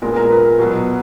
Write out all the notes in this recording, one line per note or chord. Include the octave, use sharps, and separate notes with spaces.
A#2 G#3 B3 A#4
A#4
B4
B2 F#3 B3